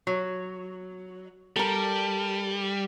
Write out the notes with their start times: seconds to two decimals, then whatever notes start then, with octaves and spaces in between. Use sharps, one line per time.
0.07 F#3
1.56 G3 A4 A#4